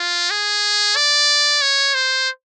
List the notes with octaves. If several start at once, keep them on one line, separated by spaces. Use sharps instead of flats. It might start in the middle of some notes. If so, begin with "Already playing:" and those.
Already playing: F4
G#4
D5
C#5
C5